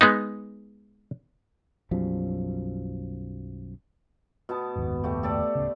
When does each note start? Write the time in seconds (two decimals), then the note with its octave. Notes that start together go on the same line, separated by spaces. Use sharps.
0.01 G#3 B3 D#4
1.91 B1 F#2 F3 G3
4.49 B2 B3 A5
4.76 F#1 D#2 G#2
5.04 A3 F#4 G4
5.23 G4 A4 D5
5.55 D1 C#3